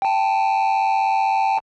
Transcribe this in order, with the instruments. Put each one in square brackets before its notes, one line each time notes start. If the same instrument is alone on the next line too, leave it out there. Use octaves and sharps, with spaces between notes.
[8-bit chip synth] G5 A5